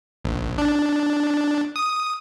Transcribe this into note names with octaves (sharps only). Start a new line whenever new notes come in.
A#1
D4
D#6